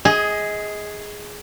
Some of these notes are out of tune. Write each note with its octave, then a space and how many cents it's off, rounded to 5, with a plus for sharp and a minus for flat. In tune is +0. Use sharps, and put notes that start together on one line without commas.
G#4 +0 D#5 +25